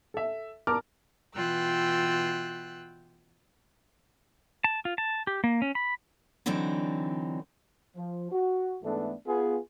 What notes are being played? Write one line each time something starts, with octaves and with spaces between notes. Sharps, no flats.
A4 E5
A#4 A5 D6 F6
B2 E3 F4 G5 E6 F#6
A5
F4
A5
G4
A#3
C#4
B5
D3 E3 F#3 C4 D4 D#4
F3
F#4
G#2 E3 A3 B3 D4 A4
B3 F4 G#4